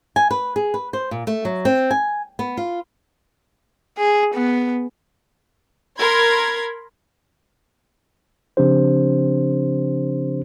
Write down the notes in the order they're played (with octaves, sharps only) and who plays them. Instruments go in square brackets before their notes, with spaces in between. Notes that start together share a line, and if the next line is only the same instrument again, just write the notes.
[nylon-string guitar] G#5
B4
G#4
B4
C5
A#2
A3
F#3
C4
G#5
B3
F4
[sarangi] G#4
B3
[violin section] A#4 B5 C6 G#6
[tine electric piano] C#3 F3 C4 D4 G4 C5